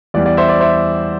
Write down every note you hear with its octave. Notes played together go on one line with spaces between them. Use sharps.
E2 E3 G3 D5
D5
C5 E5
D5
C5 E5